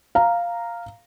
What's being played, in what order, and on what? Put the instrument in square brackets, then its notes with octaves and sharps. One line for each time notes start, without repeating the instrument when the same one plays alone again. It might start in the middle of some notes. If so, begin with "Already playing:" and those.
[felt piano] F5 A#5